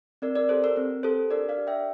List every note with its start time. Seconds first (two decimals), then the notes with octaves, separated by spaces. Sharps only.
0.22 C4 A#4 D5
0.35 A#4 D5
0.49 G4 A4 C5
0.64 A#4
0.76 C4 A#4
1.03 G4 A4 C5
1.31 D4 A#4 D5
1.49 D5 F5
1.58 G4
1.67 E5 G5